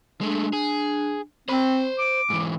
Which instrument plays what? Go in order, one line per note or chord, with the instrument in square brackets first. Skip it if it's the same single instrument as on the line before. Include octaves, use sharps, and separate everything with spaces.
[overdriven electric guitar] G#3 A3 [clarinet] D4
[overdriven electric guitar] G#4
[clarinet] C4 [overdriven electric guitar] C5 B5
[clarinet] D6
[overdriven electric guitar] G#2 E3